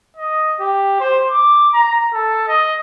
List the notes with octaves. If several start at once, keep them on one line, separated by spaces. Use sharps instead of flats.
D#5
G4
C5
D6
A#5
A4
D#5